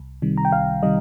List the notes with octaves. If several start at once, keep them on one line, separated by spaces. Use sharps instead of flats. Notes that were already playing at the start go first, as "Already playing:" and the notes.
Already playing: C2
C3 D#3 G3
A#5
G5
C2 F5
C3 D#3 G3 D#5